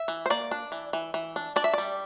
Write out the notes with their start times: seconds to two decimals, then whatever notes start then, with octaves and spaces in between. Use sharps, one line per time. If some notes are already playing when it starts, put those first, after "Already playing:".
Already playing: E5
0.08 E3
0.26 C5
0.30 A#3 D5
0.51 D4
0.72 E3
0.93 E3
1.14 E3
1.36 D4
1.56 D4 D5
1.64 E5
1.74 G3 D5